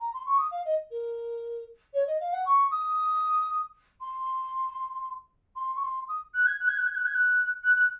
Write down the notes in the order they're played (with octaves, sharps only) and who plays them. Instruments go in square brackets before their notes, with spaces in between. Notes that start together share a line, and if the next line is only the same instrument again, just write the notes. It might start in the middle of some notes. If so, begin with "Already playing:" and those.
[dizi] A#5
C6
C#6
D#6
F5
D#5
A#4
C#5
D#5
F5
F#5
C#6
D#6
C6
C6
C#6
C6
D#6
F#6
G#6
F#6
G#6
F#6
G#6
F#6
G#6
F#6
F#6
F#6